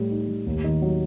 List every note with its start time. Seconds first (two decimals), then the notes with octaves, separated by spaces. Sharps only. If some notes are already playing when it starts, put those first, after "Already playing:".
Already playing: A2 G3
0.10 D#4
0.28 A2
0.46 D#2
0.64 D#3
0.82 F#3